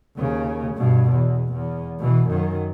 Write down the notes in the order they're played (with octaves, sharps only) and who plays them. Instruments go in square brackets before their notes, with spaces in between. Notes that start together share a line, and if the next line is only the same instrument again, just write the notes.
[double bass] D#2 C#3
G2 B2
E2
E2
B2 E3
F#2 D#3